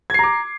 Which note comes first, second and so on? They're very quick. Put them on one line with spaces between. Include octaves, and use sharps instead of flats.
G#6 C7 A#5 D6